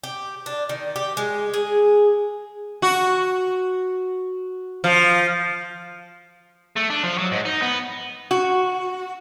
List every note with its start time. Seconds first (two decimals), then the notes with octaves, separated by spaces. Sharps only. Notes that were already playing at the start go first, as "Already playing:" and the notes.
0.04 G4
0.46 D4
0.69 D#3
0.96 G4
1.17 G#3
1.54 G#4
2.82 F#4
4.84 F3
6.77 A3
6.90 D4
7.03 F3
7.18 F#3
7.32 G#2
7.45 D#4
7.62 B3
8.31 F#4